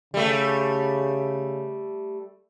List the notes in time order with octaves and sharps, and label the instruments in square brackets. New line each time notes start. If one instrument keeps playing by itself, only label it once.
[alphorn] C#3 [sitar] G3 A3